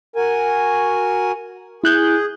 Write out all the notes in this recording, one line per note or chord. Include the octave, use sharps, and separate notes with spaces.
F#4 A#4 G#5
E4 G#4 F#6 G6